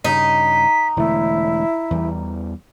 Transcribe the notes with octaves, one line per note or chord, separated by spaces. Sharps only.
G2 C#3 D#4 B6
E1 D3 A3 E4
E2 E3 G3